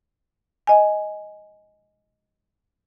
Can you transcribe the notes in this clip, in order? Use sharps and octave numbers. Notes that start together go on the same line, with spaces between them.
D#5 G#5